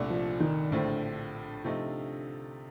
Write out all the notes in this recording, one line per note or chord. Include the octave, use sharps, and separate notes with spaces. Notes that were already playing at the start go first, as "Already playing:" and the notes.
Already playing: C2 A#2 A3 D4 A4
F3
D#3
A#1 A2 D3 F3 A3 C4
C3 F3 A3 D#4